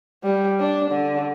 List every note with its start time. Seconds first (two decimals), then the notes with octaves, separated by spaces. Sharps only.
0.23 G3
0.60 D4
0.91 D3